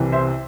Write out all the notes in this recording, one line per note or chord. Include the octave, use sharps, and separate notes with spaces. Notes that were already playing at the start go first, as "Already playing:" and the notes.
Already playing: C2 C3 E3
C5 E5